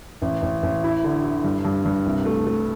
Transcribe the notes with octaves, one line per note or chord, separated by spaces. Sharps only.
A1
A1
A1
E4
D3
E4
G2
G2
G2
C2
A3
A3